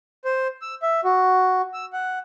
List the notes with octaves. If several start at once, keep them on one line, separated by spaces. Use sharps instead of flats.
C5
E6
E5
F#4
E6
F#5